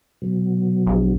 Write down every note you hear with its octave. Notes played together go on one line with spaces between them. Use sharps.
B2 F#3
A#1